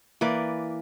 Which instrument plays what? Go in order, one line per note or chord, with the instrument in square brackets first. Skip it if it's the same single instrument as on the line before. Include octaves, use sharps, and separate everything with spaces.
[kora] E3 A#3 B4 D5